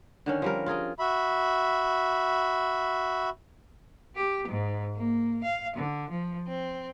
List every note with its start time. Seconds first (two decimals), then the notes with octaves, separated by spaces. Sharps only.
0.26 D3 D#3 C#4
0.42 F3 G3 A#4
0.66 F4 G#4 A#4 D#5
0.98 F#4 E5 B5
4.16 G4
4.48 G#2
4.95 A#3
5.44 F5
5.75 D3
6.09 F3
6.47 C4